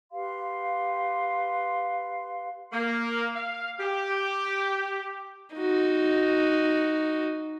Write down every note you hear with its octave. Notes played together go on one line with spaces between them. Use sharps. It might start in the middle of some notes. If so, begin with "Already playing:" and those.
G4 B4 F5 C6
A#3
F5
G4
D#4 F#4